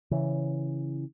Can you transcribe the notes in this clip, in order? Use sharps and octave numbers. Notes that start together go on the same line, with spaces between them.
C#3 E3